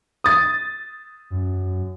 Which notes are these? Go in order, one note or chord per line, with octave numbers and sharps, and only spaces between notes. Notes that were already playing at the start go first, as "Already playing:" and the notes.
D#6 A6
F#2